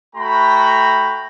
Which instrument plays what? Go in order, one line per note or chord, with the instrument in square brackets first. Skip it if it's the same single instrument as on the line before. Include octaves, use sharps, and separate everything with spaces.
[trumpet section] A3 F#4 G5 A#5 B5